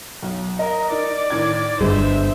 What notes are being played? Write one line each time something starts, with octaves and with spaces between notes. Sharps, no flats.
B1
A#4 D#5
D#4 A#4 D5
A2 D#3 G#6
G1 G2 G#3 C5 E5